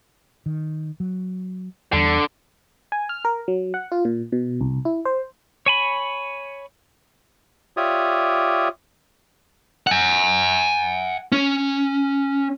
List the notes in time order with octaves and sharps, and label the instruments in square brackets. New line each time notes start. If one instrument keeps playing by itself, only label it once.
[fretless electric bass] D#3
F#3
[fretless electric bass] E2 G3 [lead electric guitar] D3
[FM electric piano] G#5
F6
A#4
F#3
F#5
F4
A#2
B2
C2
E4
C5
[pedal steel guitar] C#5 G#5 B5
[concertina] F4 G4 C#5 D5 E5 D#6
[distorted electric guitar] F#5 G#5
C#4